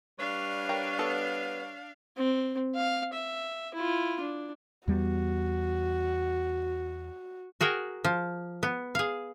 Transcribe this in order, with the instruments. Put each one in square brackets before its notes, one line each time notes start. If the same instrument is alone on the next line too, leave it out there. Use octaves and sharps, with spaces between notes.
[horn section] G3 B4 C#5 [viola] D4 F5
[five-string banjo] A#4 G5
B3 A4
[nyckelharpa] C4
F5
E5
E4 F4
D4
[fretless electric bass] E2 G3 B3 [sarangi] F#4
[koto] F#4 G#4 A#4 G5
F3
B3
G#4 F5